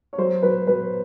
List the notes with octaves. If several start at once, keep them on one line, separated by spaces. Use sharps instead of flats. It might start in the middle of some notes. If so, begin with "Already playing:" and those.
C#5
F#3 C5
F#3 B4
F#3 B4